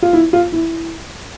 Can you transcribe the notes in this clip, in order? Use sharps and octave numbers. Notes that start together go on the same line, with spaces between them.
F4
E4
F4
E4